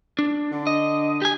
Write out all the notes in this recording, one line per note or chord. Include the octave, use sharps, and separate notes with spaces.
D4
D3
D#5
G4 G#5